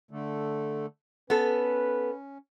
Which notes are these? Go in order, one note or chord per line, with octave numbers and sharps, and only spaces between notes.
D3 A3
B3 C#4 A4 B4